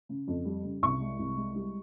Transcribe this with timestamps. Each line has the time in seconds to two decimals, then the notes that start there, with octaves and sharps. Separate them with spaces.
0.09 C#3
0.27 F2
0.45 G3
0.64 C#3
0.82 C2 C#6
1.01 G#3
1.19 C2
1.37 G#3
1.55 G3